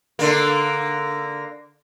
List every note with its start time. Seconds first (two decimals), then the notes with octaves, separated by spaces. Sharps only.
0.19 D3 A#3